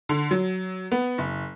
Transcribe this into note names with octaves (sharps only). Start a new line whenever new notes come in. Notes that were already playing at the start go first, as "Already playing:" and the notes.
D3
F#3
B3
F#1